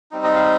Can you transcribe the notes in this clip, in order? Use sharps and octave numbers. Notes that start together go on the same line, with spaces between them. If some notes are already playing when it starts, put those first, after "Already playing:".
G3 C4 D#4
D#5
F5